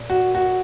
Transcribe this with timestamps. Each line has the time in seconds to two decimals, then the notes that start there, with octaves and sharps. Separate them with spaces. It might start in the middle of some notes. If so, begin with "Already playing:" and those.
Already playing: A#2
0.10 F#4
0.35 F#4